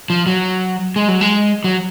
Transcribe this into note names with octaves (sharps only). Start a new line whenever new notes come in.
F3
F#3
G#3
F#3
G#3
F#3